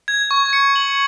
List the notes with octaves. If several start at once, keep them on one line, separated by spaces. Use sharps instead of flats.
G#6
C#6
C#7
F#7